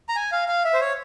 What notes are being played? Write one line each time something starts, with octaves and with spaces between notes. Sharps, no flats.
A#5
G#5
F5
F5
E5
C5
C#5